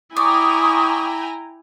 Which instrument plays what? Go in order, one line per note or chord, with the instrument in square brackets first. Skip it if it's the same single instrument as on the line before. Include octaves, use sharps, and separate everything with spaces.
[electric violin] E4 [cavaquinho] D5 [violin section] G5 G#5 A#5 [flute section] C#6 D#6